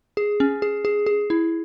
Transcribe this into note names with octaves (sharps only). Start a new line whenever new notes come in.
G#4
C#4
G#4
G#4
G#4
E4